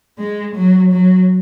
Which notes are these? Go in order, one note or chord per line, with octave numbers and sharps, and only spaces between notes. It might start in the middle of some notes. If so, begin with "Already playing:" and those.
G#3
F#3
F#3